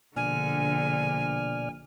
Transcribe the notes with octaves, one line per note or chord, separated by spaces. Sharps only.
A#1 B2 D3 D5 G#5 F6